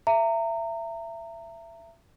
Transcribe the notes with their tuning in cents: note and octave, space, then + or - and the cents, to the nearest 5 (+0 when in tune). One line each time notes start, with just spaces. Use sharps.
E5 +25 A#5 -25